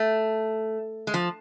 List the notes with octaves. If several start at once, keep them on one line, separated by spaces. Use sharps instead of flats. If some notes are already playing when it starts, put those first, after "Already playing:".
Already playing: A3
G#3
F3